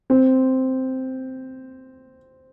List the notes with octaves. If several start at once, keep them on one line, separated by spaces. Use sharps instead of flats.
C4